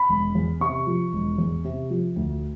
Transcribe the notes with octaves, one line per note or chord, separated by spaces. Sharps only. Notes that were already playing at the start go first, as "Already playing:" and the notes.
Already playing: B5
E1
E2
C3 C#6
F3
E1
E2
C3
F3
D2